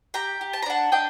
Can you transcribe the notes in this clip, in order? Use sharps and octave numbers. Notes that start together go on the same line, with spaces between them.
G4 G5 A#5
G4
A5
A#5
D4 F#5 A5
D4 D#5 G5